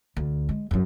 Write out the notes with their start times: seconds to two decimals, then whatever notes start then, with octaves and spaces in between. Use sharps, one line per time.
0.16 D2
0.49 G#3
0.71 F#2 F#3